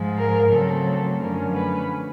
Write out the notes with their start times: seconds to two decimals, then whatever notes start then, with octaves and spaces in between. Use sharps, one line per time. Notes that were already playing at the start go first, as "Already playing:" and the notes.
Already playing: G#2 F3 G#3
0.17 A#4
0.51 C#3 F#3 A3 C4 A4
1.19 F#2 D3 F3 A3 C#4 A#4
1.54 B4